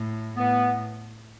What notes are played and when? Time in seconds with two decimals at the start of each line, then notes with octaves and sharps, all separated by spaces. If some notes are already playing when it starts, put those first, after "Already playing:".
Already playing: A2
0.36 A2 B3